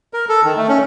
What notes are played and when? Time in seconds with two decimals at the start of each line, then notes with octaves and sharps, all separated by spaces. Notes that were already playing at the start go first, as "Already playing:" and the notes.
0.13 A#4
0.29 A4
0.44 D#3
0.57 A3
0.69 C#4